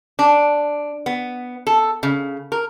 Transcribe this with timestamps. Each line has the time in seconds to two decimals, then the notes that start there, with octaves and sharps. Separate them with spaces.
0.19 D4
1.06 B3
1.67 A4
2.03 C#3
2.52 A#4